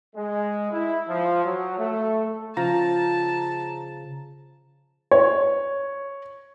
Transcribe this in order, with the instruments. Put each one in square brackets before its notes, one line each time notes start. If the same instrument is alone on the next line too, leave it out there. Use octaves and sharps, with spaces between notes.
[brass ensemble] G#3
E4
F3
F#3
A3
[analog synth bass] C#3 [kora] F3 [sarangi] A5 [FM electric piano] A#5
[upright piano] C#5